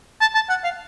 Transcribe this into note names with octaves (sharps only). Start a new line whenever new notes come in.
A5
A5
F#5
F5